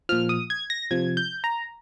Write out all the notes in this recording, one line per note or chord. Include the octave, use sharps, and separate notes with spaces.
A#2 F3 F6
D#6
G#6
A#6
C3 F3 G#6
G6
A#5